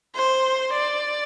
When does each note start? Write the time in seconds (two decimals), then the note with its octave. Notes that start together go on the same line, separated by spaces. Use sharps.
0.15 C5
0.73 D5